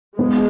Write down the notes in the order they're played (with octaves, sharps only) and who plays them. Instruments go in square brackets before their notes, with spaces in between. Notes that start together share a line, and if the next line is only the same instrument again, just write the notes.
[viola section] G#3 [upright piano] B3